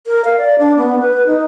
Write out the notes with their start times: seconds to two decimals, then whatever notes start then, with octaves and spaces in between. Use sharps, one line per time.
0.07 A#4
0.25 F5
0.38 D5
0.59 D4
0.77 B3
0.99 B4
1.27 D#4